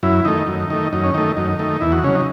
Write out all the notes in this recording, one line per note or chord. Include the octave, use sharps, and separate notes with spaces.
F#2 E4
D#3 A3 D#4
F#2
D#3 A3
F#2 D#4
C#4
D#3 A3 D#4
F#2 D#4
D#3 A3
E2 E4
F#4
C#3 F#3 C#4
D#4